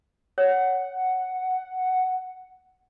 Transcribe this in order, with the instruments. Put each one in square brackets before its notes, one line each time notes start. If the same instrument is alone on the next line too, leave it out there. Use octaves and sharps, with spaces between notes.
[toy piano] C#5 [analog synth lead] F#5